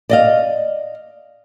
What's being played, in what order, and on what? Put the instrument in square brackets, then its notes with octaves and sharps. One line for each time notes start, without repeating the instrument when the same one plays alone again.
[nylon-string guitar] D5 D#5 F5